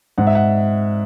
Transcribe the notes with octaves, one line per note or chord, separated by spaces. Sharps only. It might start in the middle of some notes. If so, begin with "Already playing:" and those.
G#2 F#5
E5
F#5